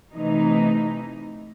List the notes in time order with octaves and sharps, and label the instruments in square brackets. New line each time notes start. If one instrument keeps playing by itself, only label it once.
[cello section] C3 E3 A3 D#4